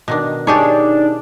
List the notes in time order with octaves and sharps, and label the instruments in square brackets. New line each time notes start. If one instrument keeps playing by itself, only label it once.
[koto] B2 D#3 D4
[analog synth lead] D4 [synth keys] D#4 [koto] G4 G#4 C#5